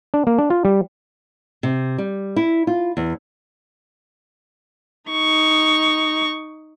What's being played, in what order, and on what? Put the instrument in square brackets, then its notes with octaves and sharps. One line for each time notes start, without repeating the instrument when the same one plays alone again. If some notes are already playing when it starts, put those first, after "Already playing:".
[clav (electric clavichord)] D4
A#3
D4
F4
G3
[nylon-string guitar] C3
G3
E4
F4
E2
[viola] D#4 C#6